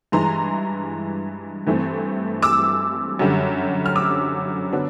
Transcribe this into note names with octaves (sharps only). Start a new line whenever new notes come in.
G2 E3 G#3 A#5 C6
G2 E3 A3 C4
D6 E6
F#2 D3 G3
F6
D6 E6
D3 F#3 B3 D4